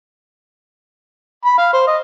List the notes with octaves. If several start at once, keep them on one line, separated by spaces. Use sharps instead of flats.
B5
F5
C5
D#5